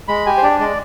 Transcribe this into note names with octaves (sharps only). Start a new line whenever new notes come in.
G#3 B5
G4 G#5
C5
D4 D5
G#3 D5